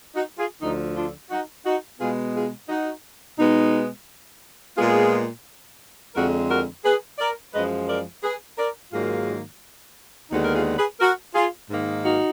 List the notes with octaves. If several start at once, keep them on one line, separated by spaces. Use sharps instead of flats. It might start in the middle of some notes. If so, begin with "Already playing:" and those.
D#4 F#4
F4 G#4
D2 D3 F3 D#4
D4 F4
D#4 F#4
D#4 F#4
B2 G#3 B3 F4 G#4
F4 G#4
D#4 F#4
B2 G#3 B3 D#4
A#2 G#3 B3 F4 G#4
F2 D3 G#3 F#4 A#4
F#4 A#4
G#4 B4
A#4 D5
F#2 F3 G#3 B4 D#5
A#4 D5
G#4 B4
A#4 D5
G#2 D#3 F#3 A#3 F4 G#4
D#2 D3 G#3 B3 D#4 F#4
A#4
F4 G#4
G#4 B4
F#4 A#4
F4 G#4
G#2 D#3 A#3
D#4 F#4